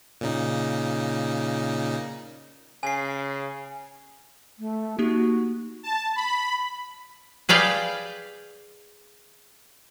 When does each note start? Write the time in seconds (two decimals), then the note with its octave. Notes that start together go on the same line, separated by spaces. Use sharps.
0.21 A#2 C#3 D#4
2.83 C#3 G#5 C7
4.59 A3
4.99 A#3 D#4 F#4 G4
5.83 A5
6.16 B5
7.49 G#4 B4 D5 F5 G5